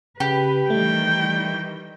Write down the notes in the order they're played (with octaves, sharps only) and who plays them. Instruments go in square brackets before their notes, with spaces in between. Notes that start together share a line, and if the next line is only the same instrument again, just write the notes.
[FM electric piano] C#3 [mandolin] G4 [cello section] B4
[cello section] D#3 E3 G3 [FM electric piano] A3 [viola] G5